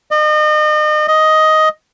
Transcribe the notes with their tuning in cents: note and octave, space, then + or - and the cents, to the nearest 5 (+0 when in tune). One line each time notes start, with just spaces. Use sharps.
D#5 -35
D#5 +10